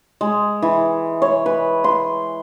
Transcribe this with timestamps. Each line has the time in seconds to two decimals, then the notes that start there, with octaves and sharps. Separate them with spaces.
0.21 G#3
0.62 E3
1.22 C#5
1.46 B4
1.84 C6